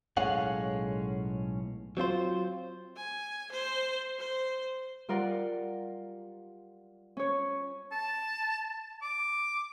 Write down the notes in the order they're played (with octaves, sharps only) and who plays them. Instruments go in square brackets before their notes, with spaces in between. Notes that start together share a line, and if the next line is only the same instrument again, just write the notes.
[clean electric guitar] B1 A2 G#3 C#4 F5 F#5
F#3 C4 F4 C5
[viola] G#5
C5
C5
[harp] G3 F4 A#4 D5 F#5
C#4 C#5
[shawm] A5
D6